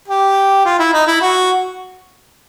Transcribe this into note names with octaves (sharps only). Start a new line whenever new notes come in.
G4
F4
E4
D#4
E4
F#4